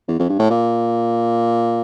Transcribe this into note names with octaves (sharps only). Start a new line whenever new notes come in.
E2
F2
G2
A2
A#2